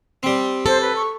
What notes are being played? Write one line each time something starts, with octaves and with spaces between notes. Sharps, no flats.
G3 C4
A4 C5
B4
C#6